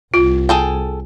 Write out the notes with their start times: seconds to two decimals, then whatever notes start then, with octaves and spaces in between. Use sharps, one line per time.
0.14 C2 F4
0.49 G#4 A4 G5